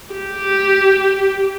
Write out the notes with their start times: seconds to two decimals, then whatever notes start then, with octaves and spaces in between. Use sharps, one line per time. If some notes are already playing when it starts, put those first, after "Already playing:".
0.13 G4